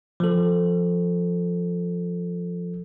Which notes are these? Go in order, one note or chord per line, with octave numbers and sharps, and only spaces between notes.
F3 A4